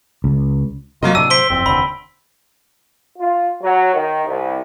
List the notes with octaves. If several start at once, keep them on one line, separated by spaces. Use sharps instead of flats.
C#2
C3 F#3 A#3 F4 D#5
A2 C3 F#3 D4 E6 D#7
C5 B6 D7 G7
F#1 F2 C4
F1 D#2 D3 B5
F4
F#3
D#3
C2